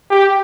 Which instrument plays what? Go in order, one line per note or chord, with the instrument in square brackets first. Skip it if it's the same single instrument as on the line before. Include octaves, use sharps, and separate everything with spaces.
[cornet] G4